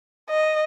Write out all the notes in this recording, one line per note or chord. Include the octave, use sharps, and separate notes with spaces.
D#5